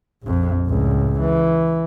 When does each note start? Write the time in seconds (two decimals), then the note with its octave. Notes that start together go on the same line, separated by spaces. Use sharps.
0.23 A#1 F2
0.67 C#2 A2
1.20 E3